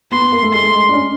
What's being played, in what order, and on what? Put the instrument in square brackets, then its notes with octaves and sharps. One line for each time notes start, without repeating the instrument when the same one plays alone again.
[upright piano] B3 [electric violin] C6
[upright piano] B3
A#3
A3
[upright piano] G#3 [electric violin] C6
[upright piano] A3
G#3
D4
C#4